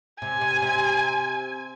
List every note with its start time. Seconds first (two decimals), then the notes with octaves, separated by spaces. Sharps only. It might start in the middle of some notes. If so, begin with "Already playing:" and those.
0.21 C3 G#5
0.41 C3
0.62 C3